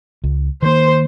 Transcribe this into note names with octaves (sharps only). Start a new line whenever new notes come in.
C#2
D#3 A#3 C5